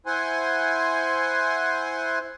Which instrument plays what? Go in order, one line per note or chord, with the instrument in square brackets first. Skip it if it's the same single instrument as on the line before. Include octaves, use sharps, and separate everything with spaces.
[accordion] E4 C5 F#5 G#5 C6